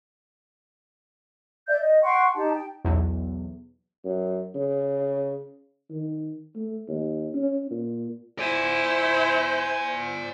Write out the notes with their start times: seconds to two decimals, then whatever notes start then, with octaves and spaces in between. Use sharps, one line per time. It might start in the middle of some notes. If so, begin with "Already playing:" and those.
1.68 D5 E5 G6
1.81 D#5
2.03 F#5 G5 C6 C#6
2.35 D#4 G4 A5
2.54 G5
2.85 B1 E2
4.05 F#2
4.55 C#3
5.90 D#3
6.56 A3
6.88 D#2
7.34 C#4
7.71 A#2
8.39 E4 C5 D5 G#5